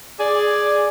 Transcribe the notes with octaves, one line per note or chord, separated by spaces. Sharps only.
G#4 D5